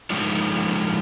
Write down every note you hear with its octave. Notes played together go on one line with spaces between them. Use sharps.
D3 F3 G#3 D#4 F4 C#5